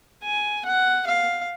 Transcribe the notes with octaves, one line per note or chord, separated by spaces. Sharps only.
G#5
F#5
F5